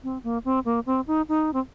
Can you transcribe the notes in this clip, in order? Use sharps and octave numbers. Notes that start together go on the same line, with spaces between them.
C4
A#3
C4
A#3
C4
D#4
D#4
C4